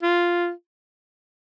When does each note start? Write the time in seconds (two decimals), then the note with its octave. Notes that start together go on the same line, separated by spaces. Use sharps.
0.02 F4